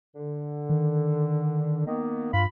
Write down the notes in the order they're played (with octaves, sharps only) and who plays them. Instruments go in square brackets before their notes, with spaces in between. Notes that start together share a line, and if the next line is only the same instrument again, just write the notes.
[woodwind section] D3
[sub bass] D#3
[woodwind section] D#3 A#3 B3
[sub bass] G2 [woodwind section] F4 B5